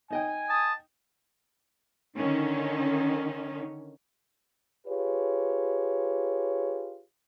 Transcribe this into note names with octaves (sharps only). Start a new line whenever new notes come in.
D#4 D#5 G5 G#5
A5 D#6
D3 D#3 C#4 D#4
F4 G4 G#4 B4 C#5